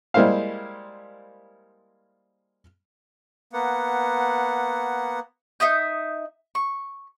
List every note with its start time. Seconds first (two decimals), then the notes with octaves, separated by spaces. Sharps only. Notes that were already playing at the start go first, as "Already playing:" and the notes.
0.14 G3 G#3 A#3 E4 C5 F5
3.53 A#3 B3 F#5
5.60 D#4 E5 D#6 G6
6.55 C#6